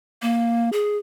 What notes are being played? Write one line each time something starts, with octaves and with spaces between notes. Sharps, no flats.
A#3
G#4